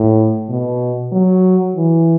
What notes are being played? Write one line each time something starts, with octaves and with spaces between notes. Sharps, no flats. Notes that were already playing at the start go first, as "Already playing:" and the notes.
Already playing: A2
B2
F#3
E3